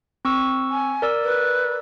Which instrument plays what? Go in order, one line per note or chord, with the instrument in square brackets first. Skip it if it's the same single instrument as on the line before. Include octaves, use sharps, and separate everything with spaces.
[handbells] C4 C#6 E6
[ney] G#5
[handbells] A#4 D5 E6
[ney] B4